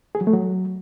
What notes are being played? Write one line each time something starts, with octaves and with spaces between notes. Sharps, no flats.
G#4
F#3
A3
F#3